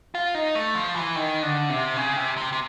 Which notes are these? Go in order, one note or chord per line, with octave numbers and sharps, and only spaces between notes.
F4
D#4
A3
F3
E3
D#3
D3
C3
C#3
C3
C3
C3